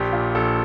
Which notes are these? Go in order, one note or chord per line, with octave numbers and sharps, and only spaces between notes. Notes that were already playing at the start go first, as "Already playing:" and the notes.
Already playing: A#1 G4
A#2
A#1 A4